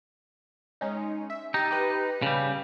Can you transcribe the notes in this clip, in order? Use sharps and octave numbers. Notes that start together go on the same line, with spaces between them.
G#3 C#4 D#4
E5
D#4 G4 E6 A6
G4 B4
C#3 G3